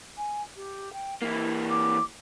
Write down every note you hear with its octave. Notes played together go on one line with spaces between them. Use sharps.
G#5
G4
G5
E3 A#3 E4
D6